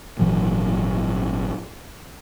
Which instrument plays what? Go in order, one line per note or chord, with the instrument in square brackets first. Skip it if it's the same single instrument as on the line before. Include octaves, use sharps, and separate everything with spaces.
[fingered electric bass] G#1 A#2 E3 F#3